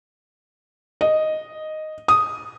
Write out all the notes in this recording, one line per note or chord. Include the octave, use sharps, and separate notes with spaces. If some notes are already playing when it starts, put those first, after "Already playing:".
D#5
D#6